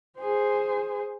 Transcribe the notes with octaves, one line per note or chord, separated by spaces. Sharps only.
G#4 C5